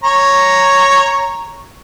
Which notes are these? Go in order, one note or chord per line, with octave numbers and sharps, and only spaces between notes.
C#5 A#5